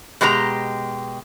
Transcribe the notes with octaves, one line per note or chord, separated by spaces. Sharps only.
B2 G#3 G4 A4 A#5